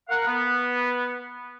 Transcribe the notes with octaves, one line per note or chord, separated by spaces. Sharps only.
A#4 F5 F#5
B3